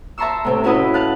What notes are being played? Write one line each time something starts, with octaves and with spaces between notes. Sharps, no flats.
E5 A5 A#5 C6 C#6 E6
A2 C3 C4
C#4 E4 F#4 B4 D#5
F5 A5 F#6